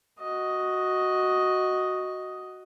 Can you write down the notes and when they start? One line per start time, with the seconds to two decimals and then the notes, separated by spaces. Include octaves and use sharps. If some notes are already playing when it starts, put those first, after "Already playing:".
0.20 F#4 D#5